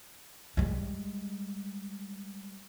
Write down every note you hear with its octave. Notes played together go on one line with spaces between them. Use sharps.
G3 G#3